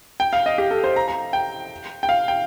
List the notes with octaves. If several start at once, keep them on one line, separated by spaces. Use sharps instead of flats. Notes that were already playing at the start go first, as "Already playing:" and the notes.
G5
F5
D#5
G4
A4
C5
A#5
A#5
G5
G5
F5
G5